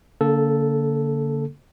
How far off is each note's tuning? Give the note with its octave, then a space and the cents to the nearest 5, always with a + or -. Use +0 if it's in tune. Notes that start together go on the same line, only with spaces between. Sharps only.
D3 -40 A#3 -10 A4 +0